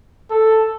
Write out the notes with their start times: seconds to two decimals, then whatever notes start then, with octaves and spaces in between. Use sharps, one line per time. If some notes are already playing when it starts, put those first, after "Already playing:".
0.30 A4